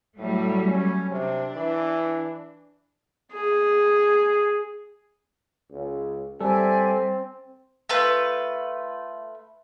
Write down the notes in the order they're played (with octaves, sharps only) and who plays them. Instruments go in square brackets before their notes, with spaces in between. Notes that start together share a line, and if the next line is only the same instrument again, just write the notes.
[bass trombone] A2 [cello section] F#3 G3 A3
[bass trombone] C#4
[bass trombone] C3 [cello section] D4
[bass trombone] E3
[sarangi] G#4
[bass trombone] C#2
[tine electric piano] G3 A4 [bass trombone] C4 [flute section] D5 E5 G#5
[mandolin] A3 F4 B4